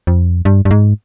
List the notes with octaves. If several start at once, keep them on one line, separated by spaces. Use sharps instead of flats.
F2
G2
G2
G#2